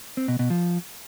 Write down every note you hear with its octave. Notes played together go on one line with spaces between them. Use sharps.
C4
B2
B2
F3